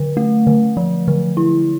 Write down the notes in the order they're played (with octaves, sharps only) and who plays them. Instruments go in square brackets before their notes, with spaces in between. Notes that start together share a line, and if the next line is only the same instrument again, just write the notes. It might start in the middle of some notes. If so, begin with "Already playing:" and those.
Already playing: [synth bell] D3
A3
D3
F3
D3
E4